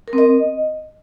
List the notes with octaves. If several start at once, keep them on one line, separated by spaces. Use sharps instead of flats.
A#4
C4
D#5